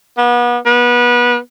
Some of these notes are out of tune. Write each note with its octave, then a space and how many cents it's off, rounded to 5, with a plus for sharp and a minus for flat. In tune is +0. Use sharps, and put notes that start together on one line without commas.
B3 -35
B3 -25